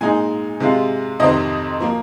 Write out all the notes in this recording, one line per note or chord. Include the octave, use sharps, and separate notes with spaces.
A#2 G#3 D#4 G#5
C3 G#3 F4
F2 C3 D#3 C4 D#5
F3 A#3